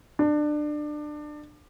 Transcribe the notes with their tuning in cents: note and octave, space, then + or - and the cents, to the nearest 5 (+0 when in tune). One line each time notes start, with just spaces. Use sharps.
D4 +25